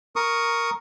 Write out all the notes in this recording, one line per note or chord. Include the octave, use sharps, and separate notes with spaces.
A#4 C#6 D#6